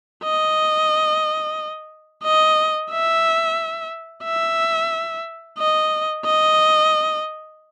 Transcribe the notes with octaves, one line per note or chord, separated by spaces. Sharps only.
D#5
D#5
E5
E5
D#5
D#5